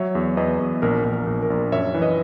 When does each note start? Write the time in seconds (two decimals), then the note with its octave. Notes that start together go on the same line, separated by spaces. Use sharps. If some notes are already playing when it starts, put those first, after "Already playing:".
Already playing: F#3 C#5 E5
0.15 E2
0.37 E2 B4 D#5
0.60 E2
0.82 A#1 A#4
1.04 A#1
1.13 A#4
1.27 A#1
1.42 A#4
1.50 A#1
1.72 F#2 C#5 E5
1.94 E3
2.02 B4 D#5